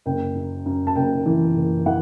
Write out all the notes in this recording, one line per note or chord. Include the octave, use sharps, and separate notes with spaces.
F#1 G5
F#2
F#2
A5
F#1 G5
E3
F#1
E3 F#5